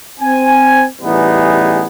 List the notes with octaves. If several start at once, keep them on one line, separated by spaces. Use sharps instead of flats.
C4 G#5
A1 E3 G3 B3 D#4 G#4